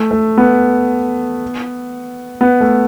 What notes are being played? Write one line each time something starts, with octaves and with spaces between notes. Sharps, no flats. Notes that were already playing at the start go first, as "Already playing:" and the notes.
Already playing: A3
A3
B3
B3
A3